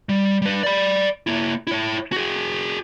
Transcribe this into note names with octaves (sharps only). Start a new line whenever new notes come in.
G3
G3 B4
D5 B5
A#3 E4
E4 C#5
F#4 G#4